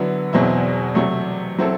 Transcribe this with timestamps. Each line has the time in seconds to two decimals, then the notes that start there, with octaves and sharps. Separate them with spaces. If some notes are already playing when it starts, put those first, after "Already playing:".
Already playing: D3 F#3 B3 E4
0.33 E2 B2 F#3 C4 E4
0.95 C3 F#3 A3
1.59 F#3 C4 E4 A4